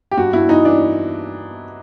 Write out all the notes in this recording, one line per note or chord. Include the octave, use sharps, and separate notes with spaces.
G4
G2 F#4
G2 E4
E3 D#4
E3 D4